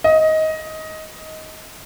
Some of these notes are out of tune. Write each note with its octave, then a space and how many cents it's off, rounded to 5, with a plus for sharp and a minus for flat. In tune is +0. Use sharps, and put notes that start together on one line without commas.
D#5 +15